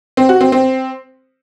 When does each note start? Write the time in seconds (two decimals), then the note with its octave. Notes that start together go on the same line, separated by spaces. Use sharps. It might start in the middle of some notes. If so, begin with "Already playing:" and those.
0.17 C4
0.29 F#4
0.41 C4
0.52 C4